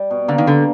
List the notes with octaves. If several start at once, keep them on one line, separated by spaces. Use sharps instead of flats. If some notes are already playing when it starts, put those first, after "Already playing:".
Already playing: G3
B2
D3 A#3
D#3
D3 G3